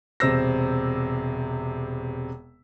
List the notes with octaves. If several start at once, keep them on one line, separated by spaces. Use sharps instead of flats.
E1 C3 C5 E6 A#6